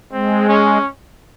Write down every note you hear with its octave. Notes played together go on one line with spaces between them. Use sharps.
G#3 C4
C#4